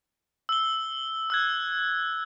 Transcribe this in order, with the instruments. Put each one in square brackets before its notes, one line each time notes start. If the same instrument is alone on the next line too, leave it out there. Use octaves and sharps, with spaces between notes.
[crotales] E6 G7
E6 F#6 G#6